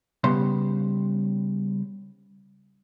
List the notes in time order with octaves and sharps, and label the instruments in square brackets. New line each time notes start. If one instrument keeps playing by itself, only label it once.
[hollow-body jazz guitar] C#3 G3 B3 C6